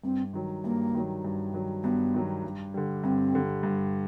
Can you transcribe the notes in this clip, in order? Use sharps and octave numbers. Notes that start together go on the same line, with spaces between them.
G2 C4
D#3 F#3
G2 A#3
D#3 F#3
G2
D#3 F#3
G2 B3
D#3 F#3
G2
D3 G3
G2 C4
D3 G3
G2